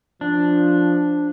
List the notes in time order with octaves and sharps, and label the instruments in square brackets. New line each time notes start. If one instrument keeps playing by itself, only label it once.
[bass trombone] F3 [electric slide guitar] D4